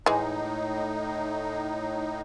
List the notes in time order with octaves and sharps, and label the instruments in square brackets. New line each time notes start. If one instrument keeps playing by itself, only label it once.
[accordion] A2 D#4 [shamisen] E3 G#3